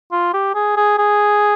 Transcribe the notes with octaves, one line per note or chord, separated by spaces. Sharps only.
F4
G4
G#4
G#4
G#4